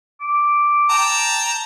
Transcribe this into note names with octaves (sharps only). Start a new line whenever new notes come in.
D6
G5 A5 A#5